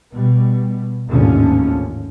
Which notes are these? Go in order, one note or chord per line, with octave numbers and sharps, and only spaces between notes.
B2 G3
G#1 D#2 A2 D3 F3 C#4